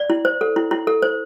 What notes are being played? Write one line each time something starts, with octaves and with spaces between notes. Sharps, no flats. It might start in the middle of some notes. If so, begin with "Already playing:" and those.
Already playing: D5
E4
C5
A4
E4
E4
A4
C5